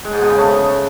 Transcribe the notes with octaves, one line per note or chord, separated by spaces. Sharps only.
G#3
G#2
B2
C#3
A3